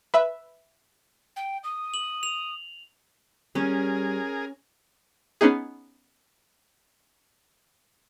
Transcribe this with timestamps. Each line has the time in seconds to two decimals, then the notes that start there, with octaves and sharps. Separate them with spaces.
0.14 B4 E5
1.36 G5
1.64 D#6
1.94 F#7
2.23 F7
3.55 G3 C#4 G#4 A#4
5.41 B3 C#4 D#4 G#4